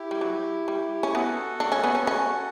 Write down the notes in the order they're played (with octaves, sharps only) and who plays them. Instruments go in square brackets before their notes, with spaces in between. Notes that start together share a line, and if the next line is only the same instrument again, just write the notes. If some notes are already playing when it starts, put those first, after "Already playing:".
Already playing: [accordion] E4 G4
[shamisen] G3
F#3
G3
C#4
[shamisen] B3 [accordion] F#4 A4
[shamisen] D4
C#4
B3
C#4
C#4